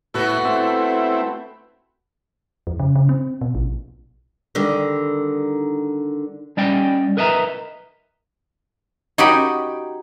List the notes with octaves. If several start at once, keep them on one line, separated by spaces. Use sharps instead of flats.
A2 B3 E4 F#4 A4
A3 C4 E4
F2
C#3
C#3
C4
B2
A#1
D3 D#3 G3
G3 C#4 D5 D#5 G5
A#4 B4 D#5 E5 G#5 A#5
D#4 F#4 G4 C#5 G5 B5